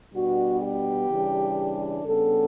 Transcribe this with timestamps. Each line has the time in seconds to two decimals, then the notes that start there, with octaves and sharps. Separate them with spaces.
0.13 B2 G3 B3 D4 F#4
0.61 G4
1.09 C#3 E3 G3 D4
2.04 C#3 G3 B3 D4 A4